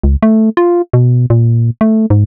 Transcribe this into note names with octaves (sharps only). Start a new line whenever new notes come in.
C#2
A3
F4
B2
A#2
A3
G#2